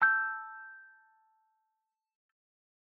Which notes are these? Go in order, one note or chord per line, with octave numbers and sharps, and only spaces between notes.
A5 E6 G6